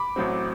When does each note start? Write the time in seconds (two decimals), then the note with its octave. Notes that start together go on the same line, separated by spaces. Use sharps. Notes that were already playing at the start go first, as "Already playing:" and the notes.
Already playing: B5 D6
0.16 A1 A2 F#3 C4